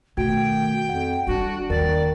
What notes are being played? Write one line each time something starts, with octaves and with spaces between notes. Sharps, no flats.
B2 D#3 A3 F#4 G5 G#6
F2 F#5
G3 D4 E4 F#4
D#2 D#3 A#4 D5